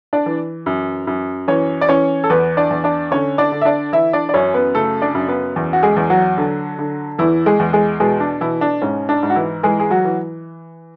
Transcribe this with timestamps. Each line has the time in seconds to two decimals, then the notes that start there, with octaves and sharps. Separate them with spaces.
0.13 D4 D5
0.26 E3
0.66 F#2
1.07 F#2
1.48 E3 C#4 C#5
1.81 D5
1.89 E3 C#4 C#5
2.24 A4
2.30 E2 B3 B4
2.57 D4 D5
2.70 E2
2.84 D4 D5
3.11 D3 C#4 C#5
3.38 D4 D5
3.52 D3
3.61 E5
3.65 D4 D5
3.93 E3 E4 E5
4.13 D4 D5
4.29 D5
4.34 F#2 C#4 C#5
4.54 B3 B4
4.74 C#3 A3 A4
5.02 D4 D5
5.15 F#2
5.28 B3 B4
5.56 E2
5.73 F#4
5.83 G#3 G#4
5.96 E2
6.10 F#3 F#4
6.37 D3
6.79 D3
7.18 E2 E3 E4
7.46 G#3 G#4
7.60 E2
7.73 G#3 G#4
8.00 B2 G#3 G#4
8.20 D4
8.41 B2 E3 E4
8.61 D4
8.82 G#2 C#4
9.09 D4
9.23 G#2
9.30 F#4
9.36 E3 E4
9.63 E3 G#3 G#4
9.80 G#4
9.90 F#3 F#4
10.05 E3